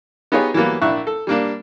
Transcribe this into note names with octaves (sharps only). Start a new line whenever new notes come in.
B3 D#4 F4 G4 G#4 C#5
E3 F#3 G3 A#3 B3
A#1 D4 E4 C#6 F#6
A4
G3 A#3 D4